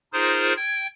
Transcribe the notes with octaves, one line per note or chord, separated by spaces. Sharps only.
D#4 F4 G#4 A#4 C5
G5 G#6